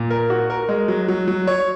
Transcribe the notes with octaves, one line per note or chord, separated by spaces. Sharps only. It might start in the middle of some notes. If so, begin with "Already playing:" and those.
Already playing: A#2
A#4
F#4
A#4
G#3
F#3
F#3
F#3
C#5